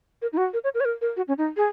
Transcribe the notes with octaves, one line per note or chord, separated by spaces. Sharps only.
A#4
D#4
F#4
A#4
C#5
A#4
C#5
A#4
A#4
F#4
C#4
D#4
G#4